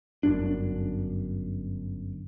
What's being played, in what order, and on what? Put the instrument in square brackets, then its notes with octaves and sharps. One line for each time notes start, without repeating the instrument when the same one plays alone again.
[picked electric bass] G1 F#2 D4